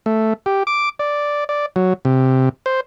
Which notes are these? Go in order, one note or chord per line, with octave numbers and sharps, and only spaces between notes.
A3
G4
D6
D5
D5
F#3
C3
C5